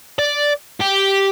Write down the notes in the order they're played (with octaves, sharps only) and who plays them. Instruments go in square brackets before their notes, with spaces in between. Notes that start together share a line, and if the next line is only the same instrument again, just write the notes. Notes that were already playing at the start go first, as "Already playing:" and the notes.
[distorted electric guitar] D5
G4